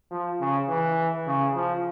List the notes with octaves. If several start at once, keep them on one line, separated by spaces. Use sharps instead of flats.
F3
C#3
E3
C#3
F3